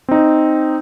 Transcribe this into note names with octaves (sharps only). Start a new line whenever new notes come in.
C4 D#4